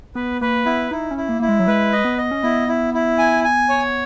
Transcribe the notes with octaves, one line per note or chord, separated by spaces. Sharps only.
B3 B4
A#3 B4
B3 E4
D#4 E4
C#4
E4
A#3
A#3 E4
G#3
F#3
G#3 B4
D#5
B3
D#5
C#4
B3 E4
E4
E4
G#5
G#5
C#5